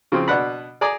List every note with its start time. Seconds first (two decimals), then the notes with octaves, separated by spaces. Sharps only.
0.12 C#3 F3 C4
0.28 B2 D4 B4 F#5 B5
0.81 G#4 D5 G#5 A#5